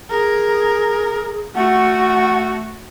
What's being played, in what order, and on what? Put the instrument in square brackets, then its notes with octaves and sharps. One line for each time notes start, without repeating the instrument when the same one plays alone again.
[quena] G#4 [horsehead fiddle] A#4
[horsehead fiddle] A3 F#4 [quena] F#5